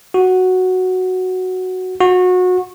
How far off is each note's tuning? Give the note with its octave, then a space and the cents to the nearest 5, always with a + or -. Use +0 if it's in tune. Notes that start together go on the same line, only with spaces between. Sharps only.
F#4 +0
F#4 -25